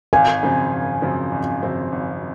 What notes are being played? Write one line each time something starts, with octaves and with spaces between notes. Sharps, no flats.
G#1 F5 G#5
F#2 C#3 F3 C4
G#1
F#2 C#3 F3 C4
G#1
F#2 C#3 F3 C4
G#1